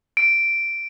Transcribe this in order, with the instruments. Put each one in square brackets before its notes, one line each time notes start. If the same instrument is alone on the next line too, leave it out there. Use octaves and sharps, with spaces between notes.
[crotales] D7